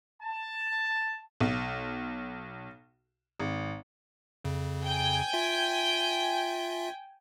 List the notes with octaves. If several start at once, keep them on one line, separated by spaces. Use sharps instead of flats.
A5
B1
G#1
F2 C#3
G5 G#5
F4 E5